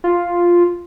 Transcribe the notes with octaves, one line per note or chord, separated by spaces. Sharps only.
F4